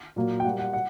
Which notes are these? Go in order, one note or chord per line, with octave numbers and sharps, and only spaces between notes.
A#2 F#3 A#3
G5
A#2 G3 A#3 F#5
F#5
F#5